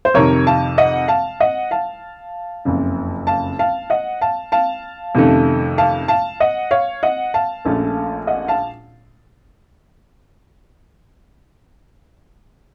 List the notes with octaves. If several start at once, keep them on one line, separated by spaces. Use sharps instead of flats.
C5
F2 C3 D#3 A#4 C#5
F5 A5
D#5 F#5
F5 A5
D#5 F#5
F5 A5
F#1 F2 C#3
F5 A5
F5 A5
D#5 F#5
F5 A5
F5 A5
F2 C3 D#3 A3 C#4
F5 A5
F5 A5
D#5 F#5
C#5 F5
D#5 F#5
F5 A5
A#1 A#2 A3 C#4
D#5 F#5
F5 A5